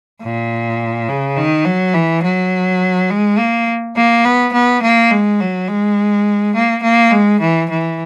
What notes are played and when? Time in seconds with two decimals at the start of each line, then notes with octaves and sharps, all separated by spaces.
0.23 A#2
1.09 C#3
1.37 D#3
1.66 F#3
1.94 E3
2.24 F#3
3.10 G#3
3.38 A#3
3.96 A#3
4.25 B3
4.53 B3
4.82 A#3
5.11 G#3
5.40 F#3
5.68 G#3
6.55 A#3
6.83 A#3
7.11 G#3
7.40 E3
7.70 E3